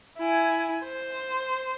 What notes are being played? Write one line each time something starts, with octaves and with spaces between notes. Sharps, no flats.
E4 G#5
C5